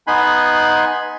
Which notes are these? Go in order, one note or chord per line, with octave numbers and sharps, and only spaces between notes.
B3 D#4 G#5 B5 C6 F#6